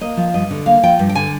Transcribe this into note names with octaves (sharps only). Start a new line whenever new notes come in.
A#3 D#5
F3
G2 D#5
D3
A#3 F5
F3 G5
G2
G5
D3 G#5